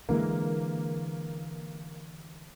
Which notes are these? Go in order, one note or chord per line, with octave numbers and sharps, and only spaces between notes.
D3 E3 G#3 A#3